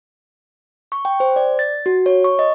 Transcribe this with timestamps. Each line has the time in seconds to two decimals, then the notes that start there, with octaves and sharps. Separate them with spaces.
0.92 C#6
1.05 G5
1.20 C5
1.36 D5
1.59 A6
1.86 F#4
2.06 C#5
2.24 C#6
2.39 D#5